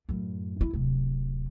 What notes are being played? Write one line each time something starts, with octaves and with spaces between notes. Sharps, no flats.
F#2 A2
E4
D1 C3